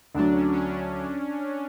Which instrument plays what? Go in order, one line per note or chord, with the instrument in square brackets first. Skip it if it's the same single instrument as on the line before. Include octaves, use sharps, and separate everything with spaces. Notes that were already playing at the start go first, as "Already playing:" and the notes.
[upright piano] D2 D3 F#3 [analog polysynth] D4
[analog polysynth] C#4
C#4
D4